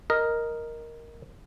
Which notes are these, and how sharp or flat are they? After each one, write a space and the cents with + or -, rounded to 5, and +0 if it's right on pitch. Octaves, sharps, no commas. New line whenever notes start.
A#4 +0 D#5 +0